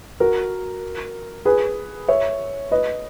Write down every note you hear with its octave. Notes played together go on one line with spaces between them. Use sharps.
F#4 A#4
G#4 B4
C#5 E5
B4 D#5